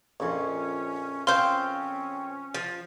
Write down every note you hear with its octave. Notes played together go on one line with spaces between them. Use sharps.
A#1 F2 C#4
C4 C#4 F5 C6
F3